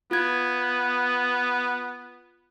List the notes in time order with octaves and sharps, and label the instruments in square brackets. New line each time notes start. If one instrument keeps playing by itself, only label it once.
[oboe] B3 [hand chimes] F4 G#6